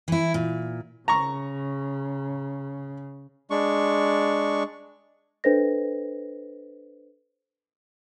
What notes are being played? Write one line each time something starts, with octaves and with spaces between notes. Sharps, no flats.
E3 E4
A#2
C#3 A#5 C#6
G#3 D4 C#6
D4 A4 B4 C5 D#5 A#6